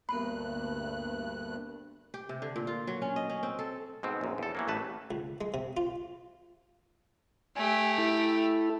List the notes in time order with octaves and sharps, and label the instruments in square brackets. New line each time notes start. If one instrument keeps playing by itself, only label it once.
[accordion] D2 G2 F#6 [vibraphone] A#3 B3 A#4 [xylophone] B5
[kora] G4
C3
D3
A#2
F4
F#3
C#4
D#5
C#4
C4
A4
[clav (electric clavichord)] G#2 B2 C4
A#1 F#2
E2 A4
E3 F#3 A#3
A1 A3 B4 A5
[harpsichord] C#2
G#3
C3
F4
[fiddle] A3 G4 [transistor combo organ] G#5
[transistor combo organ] E4 A4